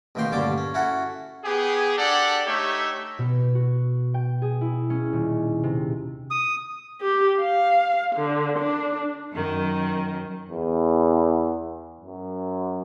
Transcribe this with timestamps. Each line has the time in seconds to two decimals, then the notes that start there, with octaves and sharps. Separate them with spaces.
0.15 A1 B2 D#3 A#3 G5 C6
0.31 G2 A#2 D3 C#4 A5 D6
0.58 C#4
0.74 C#4 E4 F#4 A4 F#5
1.45 B3 G4 G#4
1.98 D4 G4 A4 D5 F#5
2.46 A3 D#4 G4 C#5 E5
3.19 B2
3.55 F#4
4.14 G5
4.42 G#4
4.61 E4
4.90 C#4
5.13 D#1
5.63 C3
6.30 D#6
7.02 G4
7.40 F5
8.15 D3
8.59 D4
9.33 F#2 D#3
10.49 E2
12.01 F#2